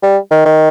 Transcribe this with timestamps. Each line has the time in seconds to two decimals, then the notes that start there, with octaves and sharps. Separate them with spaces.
0.03 G3
0.31 D#3
0.45 D#3